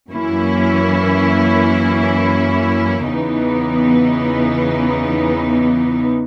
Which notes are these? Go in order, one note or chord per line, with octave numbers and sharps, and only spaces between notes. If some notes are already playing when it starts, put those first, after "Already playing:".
F#2 E3 A#3 C#4 E4
E2 C#3 E3 B3 D#4